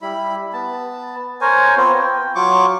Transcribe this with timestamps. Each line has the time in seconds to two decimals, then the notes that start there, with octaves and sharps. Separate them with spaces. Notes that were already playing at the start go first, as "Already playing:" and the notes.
0.02 G3 E4 B5
0.53 B3 A5
1.41 A#4 C5 C#5 G#5
1.77 B3 C4 F4
1.95 G5
2.35 F#3 F4 C#6 D6